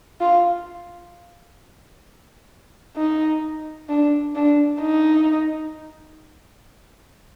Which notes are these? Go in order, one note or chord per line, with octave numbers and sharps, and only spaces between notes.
F4
D#4
D4
D4
D#4